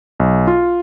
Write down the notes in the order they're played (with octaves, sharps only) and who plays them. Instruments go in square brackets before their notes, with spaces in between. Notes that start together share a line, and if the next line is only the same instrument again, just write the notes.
[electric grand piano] B1
F4